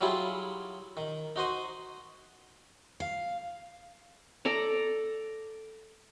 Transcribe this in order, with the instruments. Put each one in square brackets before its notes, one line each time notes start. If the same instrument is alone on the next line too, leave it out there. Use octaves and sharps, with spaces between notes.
[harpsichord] F#3 G3 E4 F4 G4 G#4
D#3
D#4 F#4 C5 D#5
[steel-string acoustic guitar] F5
[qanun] A4 D5 A#5